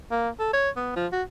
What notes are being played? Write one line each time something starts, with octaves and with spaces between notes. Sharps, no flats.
A#3
A4
C#5
B3
F3
F#4